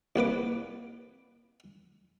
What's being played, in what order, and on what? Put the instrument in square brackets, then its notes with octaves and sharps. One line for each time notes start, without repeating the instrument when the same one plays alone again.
[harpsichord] C2 A#3 B4 D6